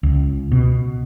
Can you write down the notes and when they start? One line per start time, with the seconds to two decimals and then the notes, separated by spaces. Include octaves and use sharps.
0.03 C#2
0.52 B2